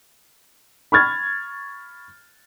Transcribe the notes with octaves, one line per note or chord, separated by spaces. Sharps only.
B5 C#6 F6 G#6 A6